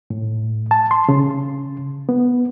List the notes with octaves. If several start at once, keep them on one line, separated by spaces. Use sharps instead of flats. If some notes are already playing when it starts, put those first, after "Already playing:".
A2
A5
C6
C#3
B3